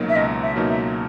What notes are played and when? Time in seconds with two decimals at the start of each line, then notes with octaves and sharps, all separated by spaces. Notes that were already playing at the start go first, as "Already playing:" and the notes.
Already playing: C#2 B2 F#3 A#3 D#4
0.09 E5
0.16 C#2 D#5
0.43 E5
0.56 B2 F#3 A#3 D#4
0.69 E5